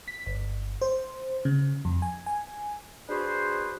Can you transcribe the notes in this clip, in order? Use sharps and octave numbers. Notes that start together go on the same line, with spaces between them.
B6
G1
C5
C#3
F2
G#5
G#5
D4 F#4 G#4 B4 C5